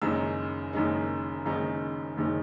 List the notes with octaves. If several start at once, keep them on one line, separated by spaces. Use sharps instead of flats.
F#1 F#2 D#3 G#3 D#4 E6
F#1 F#2 D#3 G#3 D#4
F#1 F#2 D#3 G#3 D#4
F#1 F#2 D#3 G#3 D#4